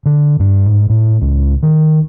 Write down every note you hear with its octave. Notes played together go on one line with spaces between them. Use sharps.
D3
G2
G#2
A2
C#2
D#3